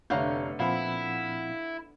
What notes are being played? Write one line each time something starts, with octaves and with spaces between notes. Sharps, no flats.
F1 D3 A3 B3 C#5 F5 A#5 G6
A#2 F3 C4 E4 F5 F#5 B5